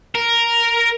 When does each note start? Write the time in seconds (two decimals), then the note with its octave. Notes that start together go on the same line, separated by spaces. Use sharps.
0.15 A#4